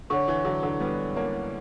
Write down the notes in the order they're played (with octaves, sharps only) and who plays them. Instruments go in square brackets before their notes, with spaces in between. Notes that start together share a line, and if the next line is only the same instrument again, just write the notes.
[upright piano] D3 [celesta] C#5 F#5 C#6
[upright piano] E3
D3 F#3
D3 F#3
G3 B3
A#3 C#4